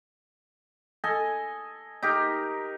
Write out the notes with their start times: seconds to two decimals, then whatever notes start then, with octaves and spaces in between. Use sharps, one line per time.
1.04 A4 D#5 G#5
2.03 D#4 G4 A#4